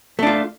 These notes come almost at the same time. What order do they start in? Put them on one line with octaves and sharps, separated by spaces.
A3 D4 F4